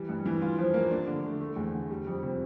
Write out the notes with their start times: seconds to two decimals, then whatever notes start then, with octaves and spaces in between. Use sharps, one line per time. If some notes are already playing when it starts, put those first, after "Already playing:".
Already playing: E3 G3
0.09 G2
0.26 E3
0.42 F4
0.59 F3
0.74 A#3
0.91 D4
1.07 D3
1.24 A3
1.41 A3
1.56 E2
1.73 D3
1.90 G3
2.07 F2
2.23 C3